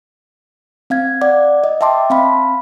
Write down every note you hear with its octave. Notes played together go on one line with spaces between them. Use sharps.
C4 F5 G#6
D5 F#5 D6
D#5
E5 G5 A5 C6 D6
C4 F5 B5